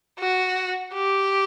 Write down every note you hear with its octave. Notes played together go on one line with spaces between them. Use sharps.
F#4
G4